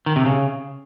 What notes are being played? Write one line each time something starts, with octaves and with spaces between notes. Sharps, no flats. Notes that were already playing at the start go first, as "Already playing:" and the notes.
D#3
C3
C#3